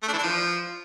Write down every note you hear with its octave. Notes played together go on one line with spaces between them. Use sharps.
A3
D4
E3
D4
F3